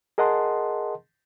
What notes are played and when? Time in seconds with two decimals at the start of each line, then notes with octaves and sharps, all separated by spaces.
0.18 G#4 A#4 D#5 F#5 A5 C6